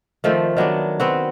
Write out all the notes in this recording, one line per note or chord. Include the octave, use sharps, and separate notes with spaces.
D#3 F3 A3 C4
D#3 F#3 B3 D4
B3 C4 F#4